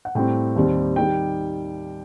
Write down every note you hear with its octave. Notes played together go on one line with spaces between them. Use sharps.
F#5
A2 G3 C4 G5
D#2 D#3 G3 C4
D#3 G3 G5